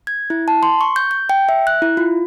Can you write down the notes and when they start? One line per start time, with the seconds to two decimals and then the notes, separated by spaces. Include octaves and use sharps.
0.07 G#6
0.30 E4
0.48 A5
0.63 C6
0.81 C#6
0.96 G6
1.11 G6
1.30 G5
1.49 E5
1.67 F#6
1.82 E4
1.97 F4